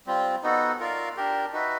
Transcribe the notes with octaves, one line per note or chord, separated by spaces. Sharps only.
G3 C4 F4
B3 D#4 F#4 A4
F4 A#4 D5 F5
D4 G4 A#4
D#4 F#4 B4 E5